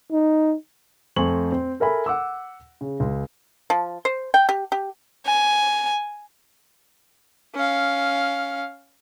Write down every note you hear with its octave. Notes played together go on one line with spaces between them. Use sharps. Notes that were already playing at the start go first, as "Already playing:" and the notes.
D#4
F2 A3 C5 G#5 C#6 F#7
C4
A4 A#4 E5 G#5 B5
F#5 D6 E6
C#3
C#2
F3
C5
G5
G4
G4
G#5
C#4 F5